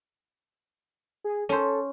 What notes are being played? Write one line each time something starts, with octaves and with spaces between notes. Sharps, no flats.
G#4
C#4 A4 C5